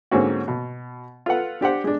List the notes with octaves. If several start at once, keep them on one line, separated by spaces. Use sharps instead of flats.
G#2 D3 A#3 C4 C#4 F#4
B2
F4 A4 B4 F#5
D4 G4 C5 F#5
G#3 D4